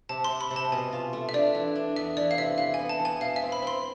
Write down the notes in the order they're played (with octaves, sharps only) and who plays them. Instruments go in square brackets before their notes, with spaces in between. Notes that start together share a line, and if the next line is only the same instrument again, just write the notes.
[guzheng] C3 [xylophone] A5
[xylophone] C6
[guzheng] C3
[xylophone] B5
[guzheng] C3
[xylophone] A5
[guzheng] B2 [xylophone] G#5
[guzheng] F4
A3
[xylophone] E5
[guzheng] D4 [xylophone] D5
[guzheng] E3
D4
[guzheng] E2 [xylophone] E5
[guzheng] E3 [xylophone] D5
[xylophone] F5
[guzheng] C3 [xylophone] E5
[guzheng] E3 [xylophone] F5
[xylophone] G#5
[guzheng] B3
[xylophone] A5
[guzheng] E3
[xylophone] G#5
[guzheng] B2 [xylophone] F5
[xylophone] E5
[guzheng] C4
[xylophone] B5
[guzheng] C4
[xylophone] C6